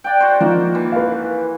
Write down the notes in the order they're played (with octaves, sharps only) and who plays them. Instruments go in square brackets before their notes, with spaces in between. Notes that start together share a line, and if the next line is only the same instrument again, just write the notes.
[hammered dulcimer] D5 F#5 G5
F#4 C5
[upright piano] F3 D#4 [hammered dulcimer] A#3
[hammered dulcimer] E3
[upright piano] B4 F5